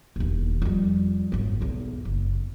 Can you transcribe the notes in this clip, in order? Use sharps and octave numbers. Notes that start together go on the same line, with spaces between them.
E1 D#2
F2 G3
G#1 F#2
B1 E2
F#1